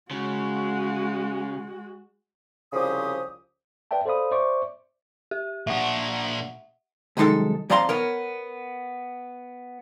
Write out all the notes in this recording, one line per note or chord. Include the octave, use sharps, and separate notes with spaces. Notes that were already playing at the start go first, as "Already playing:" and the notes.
C#3 G#3 F#4
C2 C#3 F3 G4 D#6
B4 D5 E5 G5 A5
A4 C5 D5 F5 B5 D#6
C5 D5 E5 C#6 D6
G4
A#2 D4 E5 F#5
C2 F#2 D#3 G#3 D#4 A4
F2 F3 D5 F5 A#5 C6
B3 A#4 C#5